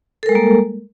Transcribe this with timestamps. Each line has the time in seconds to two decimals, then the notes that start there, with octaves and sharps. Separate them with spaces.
0.23 A4
0.26 A#4
0.29 G#3
0.32 G3
0.35 A#3